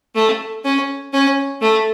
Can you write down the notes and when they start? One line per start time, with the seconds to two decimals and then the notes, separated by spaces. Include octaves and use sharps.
0.15 A3
0.64 C#4
1.13 C#4
1.61 A3